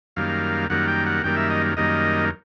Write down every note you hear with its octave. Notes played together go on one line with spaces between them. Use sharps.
F#2 D#3 G3 A#3 F5
F#2 D#3 G3 A#3 F#5
G5
F#5
F#2 D#3 G3 A#3 G5
E5
D#5
F#2 D#3 G3 A#3 D#5